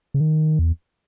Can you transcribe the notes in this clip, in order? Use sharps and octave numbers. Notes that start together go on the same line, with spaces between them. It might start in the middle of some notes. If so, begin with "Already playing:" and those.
C#3
D#3
E2